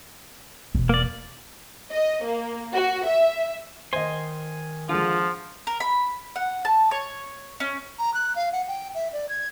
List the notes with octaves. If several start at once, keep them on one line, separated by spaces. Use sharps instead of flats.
E1
A#3 D5
D#5
A#3
F#4
E5
D#3 C5 D#5 G#5 C6
D3 F3 G#3 F4
A#4
B5
F#5
A5
C#5
C#4
A#5
F#6
F5
F#5
G5
E5
D5
G#6